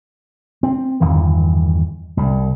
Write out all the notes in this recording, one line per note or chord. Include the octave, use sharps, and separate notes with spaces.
C4
G1 E2 D#3 E3
C2